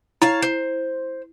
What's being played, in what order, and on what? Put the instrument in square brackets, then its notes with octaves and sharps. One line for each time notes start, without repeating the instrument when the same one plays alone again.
[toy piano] E4 [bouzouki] C#5 F5 A5
[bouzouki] C5